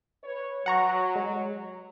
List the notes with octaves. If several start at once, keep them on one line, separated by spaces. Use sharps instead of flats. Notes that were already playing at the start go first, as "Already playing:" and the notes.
B4 C#5
F#3 F#5 A#5 C#6
G#3